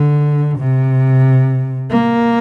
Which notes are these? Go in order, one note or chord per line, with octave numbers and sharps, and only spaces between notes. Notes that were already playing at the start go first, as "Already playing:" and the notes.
Already playing: D3
C3
A#3